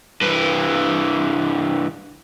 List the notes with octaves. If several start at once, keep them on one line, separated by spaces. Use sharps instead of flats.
G2 E3